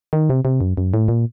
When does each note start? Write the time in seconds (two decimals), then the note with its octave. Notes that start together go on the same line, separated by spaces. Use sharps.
0.13 D#3
0.30 C3
0.45 C3
0.61 F#2
0.77 F#2
0.94 A2
1.08 A#2